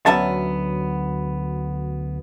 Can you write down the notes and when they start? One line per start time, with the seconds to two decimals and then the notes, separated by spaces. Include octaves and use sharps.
0.06 D2 F#3 B3 C#4 E5 A5